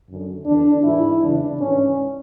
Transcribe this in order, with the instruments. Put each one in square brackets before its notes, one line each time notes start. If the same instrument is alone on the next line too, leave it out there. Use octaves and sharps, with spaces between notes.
[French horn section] F#2 D3
E2 D3 D4
G#2 E3 E4
E2 C#3 E3 D4
G#2 E3 C#4